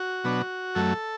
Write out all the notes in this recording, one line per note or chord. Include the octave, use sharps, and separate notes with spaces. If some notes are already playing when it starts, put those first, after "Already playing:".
Already playing: F#4
B2 F#3 B3 D4
F#2 F#3 A3 A4